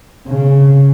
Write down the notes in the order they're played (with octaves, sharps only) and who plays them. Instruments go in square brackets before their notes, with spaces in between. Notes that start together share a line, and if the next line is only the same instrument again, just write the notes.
[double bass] C#3